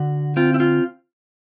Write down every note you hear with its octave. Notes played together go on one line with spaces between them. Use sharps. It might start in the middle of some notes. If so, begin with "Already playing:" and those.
Already playing: D3 F#4
C4 F4
E4
F4